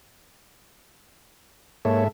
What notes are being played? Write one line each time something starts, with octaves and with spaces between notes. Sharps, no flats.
G#2 A#3 A4 C#5 E5